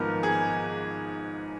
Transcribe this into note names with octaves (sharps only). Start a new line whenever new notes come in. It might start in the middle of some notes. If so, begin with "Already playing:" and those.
Already playing: G#1 G#2 F3 B3 A#4
G#4